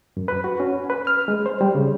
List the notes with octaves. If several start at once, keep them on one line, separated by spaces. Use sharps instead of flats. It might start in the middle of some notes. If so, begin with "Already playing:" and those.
F#2
B4
F#4
C#4
B4
F6
G#3
C5
G3
C#3